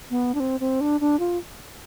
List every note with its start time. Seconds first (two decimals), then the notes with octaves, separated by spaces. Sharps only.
0.10 B3
0.35 D4
0.40 C4
0.60 C4
0.81 D4
1.01 D4
1.19 F4